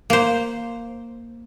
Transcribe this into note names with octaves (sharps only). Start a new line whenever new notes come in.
A#3 C5